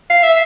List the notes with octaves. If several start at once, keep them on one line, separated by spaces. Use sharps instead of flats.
F5
E5